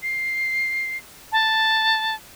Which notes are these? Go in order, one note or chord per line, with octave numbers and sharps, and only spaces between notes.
C7
A5